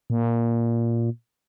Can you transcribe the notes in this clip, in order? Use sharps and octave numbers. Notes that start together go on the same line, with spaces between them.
A#2